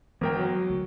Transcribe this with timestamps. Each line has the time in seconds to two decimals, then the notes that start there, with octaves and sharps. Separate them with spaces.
0.21 G1 E3 G#3 B3 A#4 G5
0.36 F#3 F#4
0.69 D2